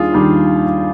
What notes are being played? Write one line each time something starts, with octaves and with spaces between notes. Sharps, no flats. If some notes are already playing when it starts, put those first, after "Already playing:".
Already playing: D#2 D#3 G3 D4 F4 G#4
D#2 D#3 G3 D4